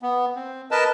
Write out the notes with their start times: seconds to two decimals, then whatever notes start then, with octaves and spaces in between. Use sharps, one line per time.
0.02 B3
0.36 C4
0.71 A#4 B4 D#5 A5